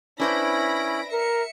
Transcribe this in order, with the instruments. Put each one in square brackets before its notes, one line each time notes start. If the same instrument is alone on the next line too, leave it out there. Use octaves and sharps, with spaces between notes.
[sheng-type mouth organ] C#4 E4 [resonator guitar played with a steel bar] D4 B4 C5 [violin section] B5 A#6 D7
[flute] A#4 [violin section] E5 C#7